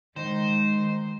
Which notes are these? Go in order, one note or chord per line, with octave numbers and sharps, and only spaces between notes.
D#3 G#3 D#4 C5